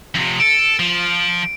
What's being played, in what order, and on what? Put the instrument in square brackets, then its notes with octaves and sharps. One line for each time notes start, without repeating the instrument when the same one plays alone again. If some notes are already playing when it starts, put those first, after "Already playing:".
[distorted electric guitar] F2 C3
[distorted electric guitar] A4 [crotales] D7
[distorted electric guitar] F3